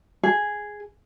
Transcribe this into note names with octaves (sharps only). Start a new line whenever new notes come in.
G#4